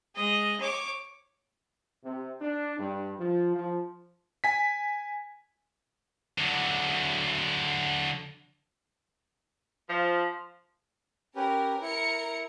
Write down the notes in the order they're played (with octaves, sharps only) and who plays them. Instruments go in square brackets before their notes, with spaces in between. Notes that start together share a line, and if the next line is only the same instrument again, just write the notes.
[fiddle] G#3 D#5
C#5 D6
[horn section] C3
D4
G2
F3
F3
[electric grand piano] G#5 B6
[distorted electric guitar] D3 F#3
[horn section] F3
[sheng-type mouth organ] C#4 G4 B4 [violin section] A#4
[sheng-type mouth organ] E4 [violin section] A#4 C#7